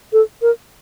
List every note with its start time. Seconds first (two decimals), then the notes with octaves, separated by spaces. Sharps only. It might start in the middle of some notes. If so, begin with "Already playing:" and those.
0.13 A4
0.42 A#4